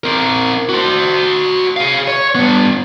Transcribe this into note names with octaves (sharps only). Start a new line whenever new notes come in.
C4 A#4
F#4 C5
G#4 F5
C#5
G2 B3